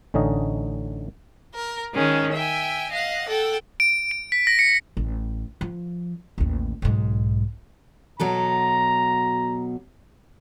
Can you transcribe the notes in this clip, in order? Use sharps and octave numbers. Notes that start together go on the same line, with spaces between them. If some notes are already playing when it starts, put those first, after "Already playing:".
A1 D3 C#4 D#4 D#5
A#4
D#3 G#3 C#4
E5 G5 G#5
D#5 F5 F#5
A4 F#5 G5
D7
D7
B6
A#6
C#7
A1
F3
A1 D#2
B1 G#2
B2 F#3 A4 A#5